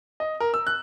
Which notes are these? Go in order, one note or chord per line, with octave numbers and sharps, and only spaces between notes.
D#5
A#4
E6
F#6